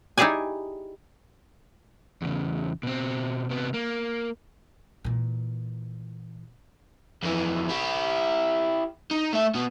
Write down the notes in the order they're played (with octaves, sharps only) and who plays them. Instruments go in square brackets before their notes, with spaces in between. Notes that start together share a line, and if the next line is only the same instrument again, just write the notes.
[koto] D#4 E4 G4 G#4 D5 G#5
[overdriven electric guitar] E2 C#3
B2 C4
C3 B3
A#3
[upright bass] A#2 E3
[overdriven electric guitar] F2 E3
E4 G4
D#4
A3 E5
B2 B3